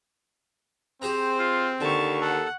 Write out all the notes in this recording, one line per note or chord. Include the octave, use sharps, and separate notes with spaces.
C4 G4 G#4 C5 A#5
F4
D#2 D3 A5 C#6
A4 F#5